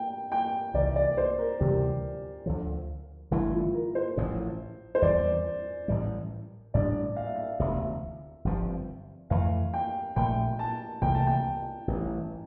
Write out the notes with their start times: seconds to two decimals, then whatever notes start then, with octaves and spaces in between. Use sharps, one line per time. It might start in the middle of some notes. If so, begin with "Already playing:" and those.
Already playing: G5
0.32 G5
0.74 C2 C3 E3 D5
0.96 D5
1.17 C5
1.39 A#4
1.60 D2 C3 E3 G3 G4
2.46 D2 D3 F3
3.31 G1 G2 E3 A3 E4
3.52 F4
3.74 A#4
3.95 C5
4.17 A1 A2 F3
4.95 C5
5.02 E2 E3 G3 D5
5.88 A1 A2 E3 G3
6.74 A1 A2 G3 D4 D5
7.16 F5
7.27 E5
7.35 F5
7.59 E1 D2 C3 E5
8.45 G1 G2 F3 C4
9.30 F2 E3 A3 F5
9.74 G5
10.16 A#1 A#2 A3 G5
10.59 A5
11.02 C2 C3 E3 A3 G5
11.15 A5
11.27 G5
11.88 A1 G2 E3